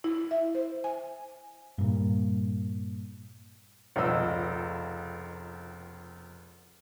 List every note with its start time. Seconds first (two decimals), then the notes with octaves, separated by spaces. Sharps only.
0.04 E4
0.31 E5
0.55 C5
0.84 G#5
1.78 G2 A#2
3.96 F1 C#2 B2 D#5 E6